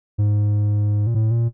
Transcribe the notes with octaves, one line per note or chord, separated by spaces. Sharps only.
G#2
A#2
A2
A#2